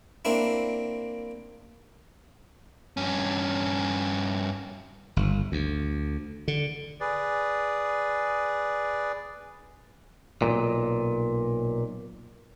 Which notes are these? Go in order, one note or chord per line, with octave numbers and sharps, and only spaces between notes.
A#3 C4 D4 E4
G2 C#4
G1
D2
D3
G#4 B4 D5
B1 G2 A#2